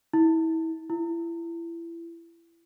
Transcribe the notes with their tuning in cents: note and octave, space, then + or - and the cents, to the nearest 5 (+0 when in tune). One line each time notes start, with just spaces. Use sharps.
E4 -30
E4 +30